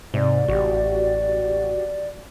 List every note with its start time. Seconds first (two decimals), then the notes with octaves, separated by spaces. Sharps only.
0.14 G#2 C3 D5
0.48 A1 F#4 G4